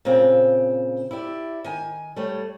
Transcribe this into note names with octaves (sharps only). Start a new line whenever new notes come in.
A#2 C#3 C4
E4 G4 D5
D#3 G#5
G3 A3 C#5